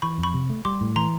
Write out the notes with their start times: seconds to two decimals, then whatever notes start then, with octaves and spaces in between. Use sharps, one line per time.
0.02 E3 B5 C#6
0.18 F2
0.23 B5 C#6
0.34 C3
0.50 A3
0.65 G3 C6 D6
0.81 A2
0.96 E3 A#5 C6